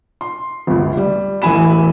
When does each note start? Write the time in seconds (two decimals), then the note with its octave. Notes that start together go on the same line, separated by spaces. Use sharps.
0.21 C6
0.67 G1 C#2
0.97 G3
1.42 E1 A1 E3 G#5 B5 E7